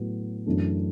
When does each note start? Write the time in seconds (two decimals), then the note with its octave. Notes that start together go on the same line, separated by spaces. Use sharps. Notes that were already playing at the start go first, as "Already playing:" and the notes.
Already playing: A2 F#3 B3
0.46 F#2 E3 A3 D4